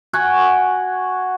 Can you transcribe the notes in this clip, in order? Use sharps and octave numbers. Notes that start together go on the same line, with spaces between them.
F#4 F#5 G#5 C#6